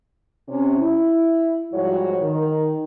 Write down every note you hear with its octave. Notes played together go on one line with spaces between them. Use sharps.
C3 C#4
E4
G#2 F3 G3 F#4 C#5
D#3